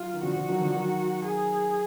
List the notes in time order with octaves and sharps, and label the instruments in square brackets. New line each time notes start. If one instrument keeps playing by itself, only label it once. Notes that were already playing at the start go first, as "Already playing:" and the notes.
Already playing: [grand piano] F#3 [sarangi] F4
[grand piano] D#3
[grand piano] D3 F3 [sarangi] F#4
[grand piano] D3 F3
D#3 F#3
D3 F3
D#3 F#3
[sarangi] G#4